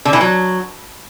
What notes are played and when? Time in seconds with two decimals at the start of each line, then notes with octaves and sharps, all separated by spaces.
0.05 D3
0.13 E3
0.21 F#3